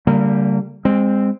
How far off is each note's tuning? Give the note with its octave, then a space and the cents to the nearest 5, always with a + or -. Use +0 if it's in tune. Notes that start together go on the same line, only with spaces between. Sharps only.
D3 -35 G3 +0 A#3 -25
G#3 -25 C4 +0